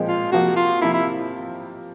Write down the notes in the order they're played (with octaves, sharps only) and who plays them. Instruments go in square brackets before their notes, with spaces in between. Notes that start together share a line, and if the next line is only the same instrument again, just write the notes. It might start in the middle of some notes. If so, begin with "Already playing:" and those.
Already playing: [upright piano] A#2 F3 G#3 C4
[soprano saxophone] F4
[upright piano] C3 F3 A#3 [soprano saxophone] F#4
[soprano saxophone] F4
[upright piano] C3 F3 A#3 [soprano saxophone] E4
[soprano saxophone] E4